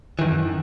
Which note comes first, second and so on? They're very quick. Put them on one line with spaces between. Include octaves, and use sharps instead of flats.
E3 D#3 F#2